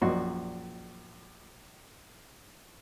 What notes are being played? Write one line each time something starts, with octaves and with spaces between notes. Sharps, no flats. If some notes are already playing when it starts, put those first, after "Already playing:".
A#1 F#2 A#2 F#4 C6